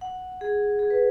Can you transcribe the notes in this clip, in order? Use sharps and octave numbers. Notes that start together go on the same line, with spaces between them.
F#5
G#4
G#4
B4